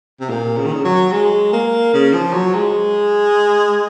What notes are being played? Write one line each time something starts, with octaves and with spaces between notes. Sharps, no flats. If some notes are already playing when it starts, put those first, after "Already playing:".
C3
A#2
C#3
D#3
C#3
F#3
G#3
A#3
C#3
F3
F#3
G#3